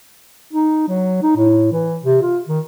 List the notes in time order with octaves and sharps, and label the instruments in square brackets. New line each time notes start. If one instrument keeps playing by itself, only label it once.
[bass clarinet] D#4
F#3
D#4
A2
E3
C3
F4
D#3